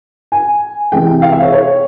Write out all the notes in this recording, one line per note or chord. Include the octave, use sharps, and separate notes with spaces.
G#5
C3 E3 G#3 G5
F5
E5
C#5
C#5